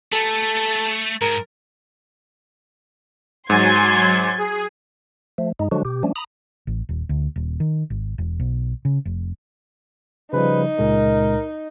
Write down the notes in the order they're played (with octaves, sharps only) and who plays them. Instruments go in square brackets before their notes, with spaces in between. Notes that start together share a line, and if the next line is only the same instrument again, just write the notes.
[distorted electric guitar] A3 [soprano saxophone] A4
[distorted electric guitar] G#2 [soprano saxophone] A#4
[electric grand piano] G#2 [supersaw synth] F#3 G#5 [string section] C6 G#6 [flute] A6
[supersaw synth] G#4
[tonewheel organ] F3 A3
G2 G#3 D#4
D3 F3 F#3 G#3 D4 F#4
B2 G4
F3 G3 A3 C#4 D4
A#5 B5 D#6
[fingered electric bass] A1
D#1
D2
D#1
D#3
G#1
E1
B1
C#3
F1
[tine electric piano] C#3 F3 G3 [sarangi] D#4 [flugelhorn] B4
[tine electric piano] C#2 A#2 G#3 [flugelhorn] A#4